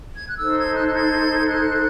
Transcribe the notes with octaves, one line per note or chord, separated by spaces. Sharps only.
G#6
F#6
D#4 A4 C5 E6
G#6
F#6
F#6
G#6
F#6